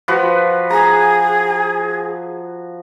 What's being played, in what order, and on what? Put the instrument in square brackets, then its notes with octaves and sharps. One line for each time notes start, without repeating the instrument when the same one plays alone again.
[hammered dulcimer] F3 F#4 B4
[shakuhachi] G#4 [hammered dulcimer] A#5